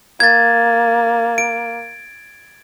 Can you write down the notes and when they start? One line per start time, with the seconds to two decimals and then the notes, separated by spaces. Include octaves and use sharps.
0.20 A#3 G#6 A6
1.38 D7